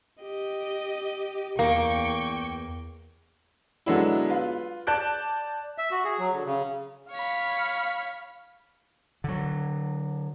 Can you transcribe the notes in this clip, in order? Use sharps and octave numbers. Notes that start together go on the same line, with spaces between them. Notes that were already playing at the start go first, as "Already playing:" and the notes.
G4 D#5
E2 A#3 G5 C#6
D3 F#3 G#3 B3 D4 E4
F4 B4
D5 A5 F#6 G6 D7
E5
F#4
G#4
F#3
D3
C#3
C#5 F5 B5
D3 F#3